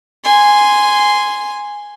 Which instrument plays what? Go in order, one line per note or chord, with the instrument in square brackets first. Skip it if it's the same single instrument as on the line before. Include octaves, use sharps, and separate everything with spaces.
[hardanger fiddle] G#5 C6